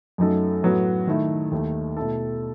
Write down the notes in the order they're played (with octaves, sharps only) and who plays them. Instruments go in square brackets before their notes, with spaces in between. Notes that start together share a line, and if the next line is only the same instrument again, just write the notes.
[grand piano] F#2 F#3 A3 D#4 A4
A2 F#3 B3 F#4
D#3 A3 E4
D#2 D#3 A3
B2 A3 E4 A4